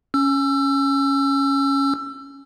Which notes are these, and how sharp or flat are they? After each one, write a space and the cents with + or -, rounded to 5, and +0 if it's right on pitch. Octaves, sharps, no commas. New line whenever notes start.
C#4 +0 E6 +25